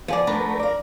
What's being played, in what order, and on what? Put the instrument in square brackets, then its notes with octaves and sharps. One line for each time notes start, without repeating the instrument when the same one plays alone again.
[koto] F3 [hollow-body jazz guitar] B3 G#4 D5
[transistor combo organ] A3 A#4 B4 [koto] D4
[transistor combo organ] A#4 [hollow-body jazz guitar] D5 F5